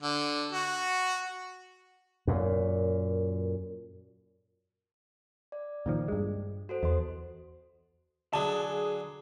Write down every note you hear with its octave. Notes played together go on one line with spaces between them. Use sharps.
D3
F#4
F#2 A#2
D5
A#2 D#3 F3
G2 G#3
F#4 A4 C5
E2 D#5 C6
D3 F#3 G#4 A5